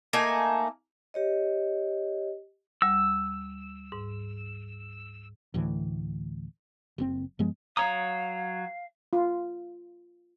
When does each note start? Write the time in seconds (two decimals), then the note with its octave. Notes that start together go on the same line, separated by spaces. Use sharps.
0.13 A3 A#3 D#4 G#5
1.14 G4 C#5 D#5
2.82 D2 G3 E6
3.92 G#2
5.54 D2 A2 E3
6.98 F#1 A#2 C4
7.39 G2 F3 G#3 B3
7.77 F#3 C#5 F5 A#5 D#6
9.13 F4